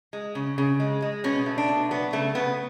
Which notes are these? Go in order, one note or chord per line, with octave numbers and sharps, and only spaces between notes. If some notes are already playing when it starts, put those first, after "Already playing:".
G#3
C#3
C#3
G#3
G#3
B2 C#4
A3
D4
B2
F#3 B3
C#3 A3
C#3 B3